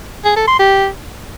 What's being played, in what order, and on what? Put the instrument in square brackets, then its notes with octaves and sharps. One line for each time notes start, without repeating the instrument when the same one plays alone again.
[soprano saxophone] G#4
A4
C6
G4